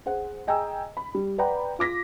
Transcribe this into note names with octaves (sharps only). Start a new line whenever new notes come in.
G#4 C5 F#5
G#4 D#5 G5 G#5 A#5 E6
B5
G3
B4 D5 F#5 G5 A#5 B5
F4 D6 A#6 B6